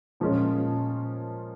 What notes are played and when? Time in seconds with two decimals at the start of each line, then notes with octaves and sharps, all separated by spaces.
0.20 A#2 F3 G#3 C#4 F4